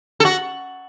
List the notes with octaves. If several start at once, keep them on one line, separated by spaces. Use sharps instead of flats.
A4
F#4